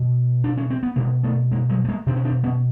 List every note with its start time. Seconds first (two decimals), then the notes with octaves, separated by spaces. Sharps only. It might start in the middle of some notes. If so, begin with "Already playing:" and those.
Already playing: B2
0.44 D4
0.57 C#4
0.70 C4
0.83 B3
0.96 B2 G#3 A#3
1.23 A3 B3
1.52 G#3 A#3
1.69 F#3 G#3
1.84 A3
1.88 G#3 A#3
2.06 B2 C4 D4
2.16 C#4
2.25 C4 D4
2.43 B3 C#4